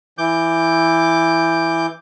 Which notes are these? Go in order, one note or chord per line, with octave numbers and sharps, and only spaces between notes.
E3 D6 G6